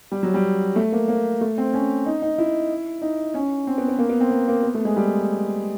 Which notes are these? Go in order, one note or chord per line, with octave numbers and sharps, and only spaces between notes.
G3
F#3
G3
A3
A#3
A#3
A3
C4
C#4
D#4
D#4
E4
D#4
C#4
C4
B3
B3
A#3
B3
C4
A#3
A#3
B3
A3
G#3
G3